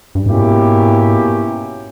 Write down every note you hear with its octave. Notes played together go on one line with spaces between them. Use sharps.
G2
G#2 B2 A#3 C#4 E4 G4